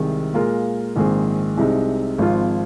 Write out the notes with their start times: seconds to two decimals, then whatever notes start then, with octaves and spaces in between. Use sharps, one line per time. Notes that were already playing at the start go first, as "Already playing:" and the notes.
Already playing: C2 C3 D#3 G#3
0.34 A#2 G#3 F4 A#4
0.96 A#1 G#2 D#3 C4 G#4
1.57 C2 C3 G#3 D#4
2.18 G#1 G#2 F3 C4 F4